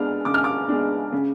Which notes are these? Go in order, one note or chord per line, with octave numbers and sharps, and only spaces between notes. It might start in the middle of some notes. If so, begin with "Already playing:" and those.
Already playing: G#3 B3 D4 F6
C#3 D6
F6
D6
G#3 B3 D4
C#3